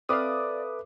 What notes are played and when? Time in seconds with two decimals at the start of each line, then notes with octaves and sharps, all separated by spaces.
0.09 C4 A4 B4 D5 E5 F5 D6 D#6